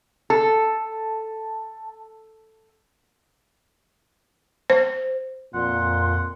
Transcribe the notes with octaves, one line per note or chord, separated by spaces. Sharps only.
A4 A5
C5
F2 A#2 F#5 C6